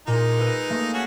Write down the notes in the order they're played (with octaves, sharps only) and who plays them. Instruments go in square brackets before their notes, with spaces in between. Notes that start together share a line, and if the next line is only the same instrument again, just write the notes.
[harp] A#2 [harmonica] G#3 D#4
[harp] B4 E6
A3 A#3
[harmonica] C#4 F#4 G#4